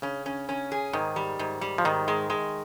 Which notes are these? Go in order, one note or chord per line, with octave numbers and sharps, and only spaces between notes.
C#3 C#4
C#4
C#4
G#4
G#2 D#3
G3
G#2
G3
F3
G#2 D#3
G#3
G#3